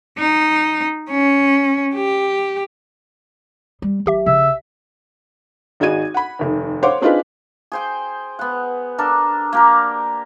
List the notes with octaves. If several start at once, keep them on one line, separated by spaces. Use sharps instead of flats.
D#4
C#4
G4
G3
G#1 F#3 G4 E5
A#1 C#3 E5
G#1 D#4 F#4 G#4 G#6 D#7
F#5 B5
F1 D#2
C5 C#5 F5 F#5 C6 D6
C4 D4 D#4 F4 G#4 B4
G#4 C5 G5
B3 F#5
D4 A4 A#4
A#3 G4 A#4